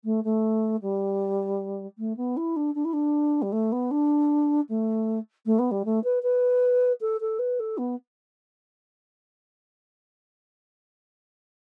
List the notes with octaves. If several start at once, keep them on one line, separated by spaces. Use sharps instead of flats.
A3
A3
G3
A3
B3
E4
D4
D4
E4
D4
G3
A3
B3
D4
A3
A3
B3
G3
A3
B4
B4
A4
A4
B4
A4
B3